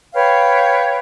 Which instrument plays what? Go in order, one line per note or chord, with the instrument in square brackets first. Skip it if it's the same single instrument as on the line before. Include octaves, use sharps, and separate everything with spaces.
[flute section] B4 C#5 F5 G5